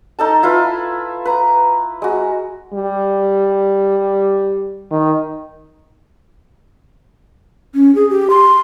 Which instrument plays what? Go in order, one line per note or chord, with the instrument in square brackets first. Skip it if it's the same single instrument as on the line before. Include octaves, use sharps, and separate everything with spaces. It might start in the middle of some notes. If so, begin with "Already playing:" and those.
[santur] D#4 A4 A5
E4 F4 B4 B5
B4 A#5
G#3 F#4
[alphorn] G3
D#3
[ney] C#4
G#4
G4
C6